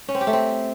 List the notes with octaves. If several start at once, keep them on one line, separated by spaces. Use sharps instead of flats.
C#4
C4
G4
A3
C4